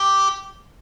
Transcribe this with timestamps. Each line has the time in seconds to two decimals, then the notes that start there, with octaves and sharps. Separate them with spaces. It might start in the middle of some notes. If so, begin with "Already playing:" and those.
Already playing: G4